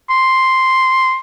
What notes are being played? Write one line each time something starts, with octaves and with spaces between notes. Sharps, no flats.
C6